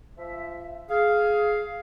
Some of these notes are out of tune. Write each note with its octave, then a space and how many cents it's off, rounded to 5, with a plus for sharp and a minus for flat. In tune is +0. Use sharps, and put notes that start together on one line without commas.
F3 -20 E5 +5
G#4 +15 F5 +0